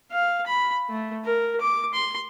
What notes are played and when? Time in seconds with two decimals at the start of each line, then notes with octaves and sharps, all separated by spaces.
0.11 F5
0.46 B5
0.90 A3
1.25 A#4
1.61 D6
1.94 C6